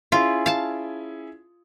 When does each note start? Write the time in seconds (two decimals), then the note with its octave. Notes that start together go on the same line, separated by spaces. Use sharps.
0.12 C#4 E4 F4 G#4
0.46 F5 A5